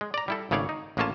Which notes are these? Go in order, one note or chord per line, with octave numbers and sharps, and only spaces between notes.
G#3
D5 A#5
G3 E4 A4
G#1 C#3 A3 C#5 D5 F5
D#4
A1 G#3 A#3 C#4 F4 A5